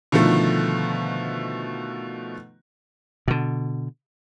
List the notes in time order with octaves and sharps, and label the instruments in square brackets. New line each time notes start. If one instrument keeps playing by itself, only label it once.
[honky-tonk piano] B2 D3 D#3 F3 A3
[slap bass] B2 D3